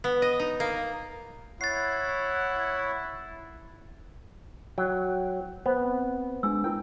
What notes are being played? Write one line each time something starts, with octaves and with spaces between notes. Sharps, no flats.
B3
D#5
D#4
A#3
E4 C#5 F#5 A6 C7
F#3 G5
B3 C5
C4
G#3 D4 G#5 E6
E4 A#4 G5